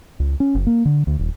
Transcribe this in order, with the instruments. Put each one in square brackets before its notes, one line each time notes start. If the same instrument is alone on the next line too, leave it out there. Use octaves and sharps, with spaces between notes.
[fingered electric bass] C#2
C#4
F#1
A#3
D3
D2
D#1